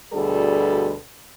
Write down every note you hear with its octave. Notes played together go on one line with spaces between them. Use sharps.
D2 B2 G3 D4 G#4 A4